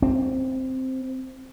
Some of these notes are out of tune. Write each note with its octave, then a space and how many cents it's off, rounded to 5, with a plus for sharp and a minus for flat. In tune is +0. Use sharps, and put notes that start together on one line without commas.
C4 +0